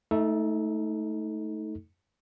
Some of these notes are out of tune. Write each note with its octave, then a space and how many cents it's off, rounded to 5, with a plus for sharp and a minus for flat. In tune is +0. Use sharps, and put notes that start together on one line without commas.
A3 +0 D#4 +30 A4 +0